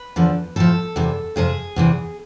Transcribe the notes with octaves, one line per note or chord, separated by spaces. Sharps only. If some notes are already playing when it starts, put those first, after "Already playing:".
Already playing: B4
E2 D3 F3
A2 F3 A4
E2 C3 E3
F2 C3 F3 G#4
E2 C3 E3